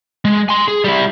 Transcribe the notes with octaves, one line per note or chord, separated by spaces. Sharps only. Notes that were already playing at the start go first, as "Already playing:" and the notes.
G#3
G#5 C6
G#4
G3 E4